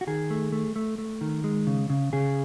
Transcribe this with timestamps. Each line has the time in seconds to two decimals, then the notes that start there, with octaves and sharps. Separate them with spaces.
0.01 F#4
0.07 D#3 G#4
0.30 A3
0.52 A3
0.76 A3
0.98 A3
1.21 D#3
1.44 G#3
1.67 C#3
1.90 C#3
2.13 C#3 G#4